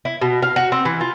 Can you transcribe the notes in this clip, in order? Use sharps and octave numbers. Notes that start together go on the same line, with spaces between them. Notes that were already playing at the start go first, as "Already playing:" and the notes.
E4
B2
F5
F#4
C4
E3
F4